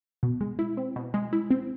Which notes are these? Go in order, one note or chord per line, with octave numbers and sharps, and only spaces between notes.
B2
G#3
E4
C4
B2
G#3
E4
C4